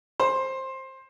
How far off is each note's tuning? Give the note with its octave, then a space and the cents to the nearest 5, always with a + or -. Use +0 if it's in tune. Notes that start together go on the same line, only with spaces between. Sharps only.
C5 +15